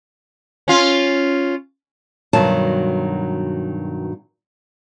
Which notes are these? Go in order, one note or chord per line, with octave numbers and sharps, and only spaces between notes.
C#4 F4
G2 B2 D#3 F#3 A5